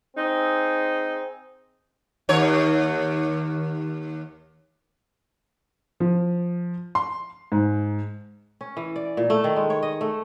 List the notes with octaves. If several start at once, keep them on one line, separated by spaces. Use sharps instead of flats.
C4 D#4 G#4
D#2 C#5
F3
C6
G#2
C#4
E3
D5
A#2
A3
D#3
G#3
C#5
D#5
A3